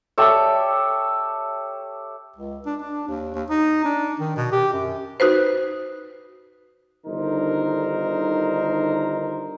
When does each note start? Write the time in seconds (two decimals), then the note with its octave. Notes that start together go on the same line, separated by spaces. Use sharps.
0.18 G4 A4 C#5 E5
2.36 C#2
2.66 D4
2.81 D4
3.08 D#2
3.34 D#2
3.50 D#4
3.84 D4
4.19 D#3
4.36 B2
4.52 G4
4.73 F#2
5.20 D#4 F#4 B4 C5
7.07 G1 D3 D#3 D#4 A#4 C5